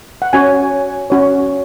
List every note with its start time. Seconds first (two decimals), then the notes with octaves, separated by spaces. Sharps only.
0.22 F#5
0.33 C#4 F#4 C#5 G#5
1.10 C#4 F#4 C#5